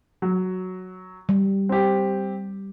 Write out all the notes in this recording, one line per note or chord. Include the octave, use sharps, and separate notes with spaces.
F#3
G3
C4 G4